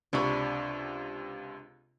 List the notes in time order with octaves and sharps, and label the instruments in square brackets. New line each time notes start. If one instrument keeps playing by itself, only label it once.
[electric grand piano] C#2 C3 C#6 [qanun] D4 B5